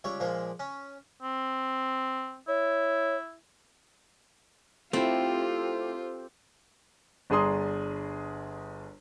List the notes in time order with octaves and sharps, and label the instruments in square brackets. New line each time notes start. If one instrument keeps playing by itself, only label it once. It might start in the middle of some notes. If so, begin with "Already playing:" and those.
[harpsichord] C#2 G3 C#5
A#2 F3 G#3
C#4
[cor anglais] C4
[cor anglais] E4 [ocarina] C#5
[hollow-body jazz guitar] A3 E4 [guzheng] C4 [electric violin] F4 [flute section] G4 A4 C5
[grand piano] G1 D4 G#4 A#5 C6 D#6